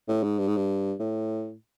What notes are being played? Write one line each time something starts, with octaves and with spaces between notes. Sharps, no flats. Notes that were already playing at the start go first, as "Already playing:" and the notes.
A2
G#2
G2
G#2
G2
A2